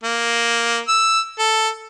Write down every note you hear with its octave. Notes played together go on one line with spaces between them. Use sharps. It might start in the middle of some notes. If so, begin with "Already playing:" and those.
A#3
E6
A4